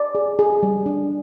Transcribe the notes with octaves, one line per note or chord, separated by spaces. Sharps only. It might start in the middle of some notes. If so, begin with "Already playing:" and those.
Already playing: D5
G#4
G#4
G3
D4